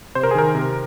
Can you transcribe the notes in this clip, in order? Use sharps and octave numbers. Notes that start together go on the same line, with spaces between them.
C3 C5
A#4
G#4
D#3 A#4
C3